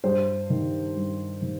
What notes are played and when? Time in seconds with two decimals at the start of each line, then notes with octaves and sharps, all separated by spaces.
0.04 G2 C5
0.50 D#3
0.96 G2
1.42 D#3